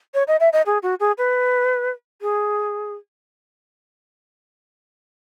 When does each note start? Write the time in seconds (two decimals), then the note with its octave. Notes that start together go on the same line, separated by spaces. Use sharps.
0.14 C#5
0.28 D#5
0.40 E5
0.53 D#5
0.66 G#4
0.83 F#4
1.00 G#4
1.18 B4
2.21 G#4